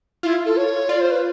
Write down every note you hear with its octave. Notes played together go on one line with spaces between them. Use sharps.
E4 F4
A4
C#5
F4 D5
C5
B4